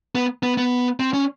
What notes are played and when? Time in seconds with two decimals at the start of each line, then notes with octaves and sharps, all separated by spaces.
0.15 B3
0.43 B3
0.57 B3
1.00 C4
1.13 C#4